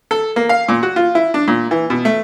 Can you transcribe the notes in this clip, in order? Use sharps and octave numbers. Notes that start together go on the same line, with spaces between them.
A4
A#3
F5
A#2
F#4
F4
E4
D4
A#2
E3
B2
A3